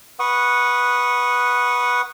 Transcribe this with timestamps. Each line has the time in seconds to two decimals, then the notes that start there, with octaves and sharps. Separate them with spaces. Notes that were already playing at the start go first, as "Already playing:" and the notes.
0.20 B4 F#5 C#6 D#6